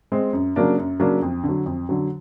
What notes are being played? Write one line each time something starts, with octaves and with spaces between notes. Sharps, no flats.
G#3 C4
F#2
C#3 F#3 A#3 D4
F#2
C#3 F#3 A#3 D4
F2
D3
F#3
F2
D3 F#3